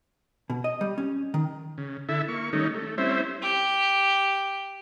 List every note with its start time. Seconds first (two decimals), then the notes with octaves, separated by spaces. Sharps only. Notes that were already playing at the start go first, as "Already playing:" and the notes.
0.50 B2
0.64 D#5
0.81 G3
0.98 C#4
1.34 D#3
1.78 C#3
2.09 D3 E4 A4 E5
2.28 A#3 C#6
2.53 D#3 G3 A3 C#4 D#4
2.74 A3
2.98 G3 C4 C#4 E4 C5 E5
3.42 G4